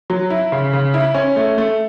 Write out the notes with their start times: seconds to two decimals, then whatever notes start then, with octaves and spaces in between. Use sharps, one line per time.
0.10 F#3
0.30 E4
0.52 C#3
0.73 C#3
0.94 E4
1.15 C#4
1.36 A3
1.58 A3